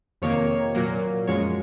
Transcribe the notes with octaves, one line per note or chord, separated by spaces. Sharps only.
F2 C3 D#3 A#3 C#5
A#2 F#3 A#3
F#2 F3 G#3 C#5